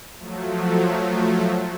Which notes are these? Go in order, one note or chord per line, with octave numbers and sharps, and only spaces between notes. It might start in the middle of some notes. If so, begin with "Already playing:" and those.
F3 F#3 A3